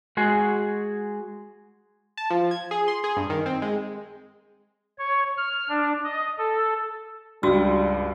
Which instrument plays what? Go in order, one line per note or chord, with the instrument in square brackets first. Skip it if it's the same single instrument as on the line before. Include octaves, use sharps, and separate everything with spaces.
[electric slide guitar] G#3 F#4 G#4
[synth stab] A5
F3
G#6
G#4
C6
G#4
G2
D#3
C4
G#3
[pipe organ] C#5
F6
D4
D#5
A4
[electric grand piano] C#2 G2 [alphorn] G3 [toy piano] F#4 E6